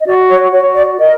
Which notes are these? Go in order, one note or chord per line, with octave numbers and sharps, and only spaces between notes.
D#5
F#4 D5
C#5
F#4 C#5
D5
A#4 D#5